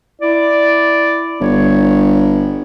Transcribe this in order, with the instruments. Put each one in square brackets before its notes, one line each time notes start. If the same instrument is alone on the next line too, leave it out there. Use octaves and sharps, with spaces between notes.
[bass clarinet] E4 [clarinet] D5
[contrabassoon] G1 [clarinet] C#5